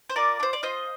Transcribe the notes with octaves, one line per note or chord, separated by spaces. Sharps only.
C5
F4 A#4 D5
D4
C5
D5
F4 C5 D#5